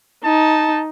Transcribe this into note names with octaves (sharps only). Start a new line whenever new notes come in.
D#4 A5